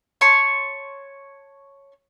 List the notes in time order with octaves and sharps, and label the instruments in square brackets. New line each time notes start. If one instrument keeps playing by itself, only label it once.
[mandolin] C#5 A5 C6 C#6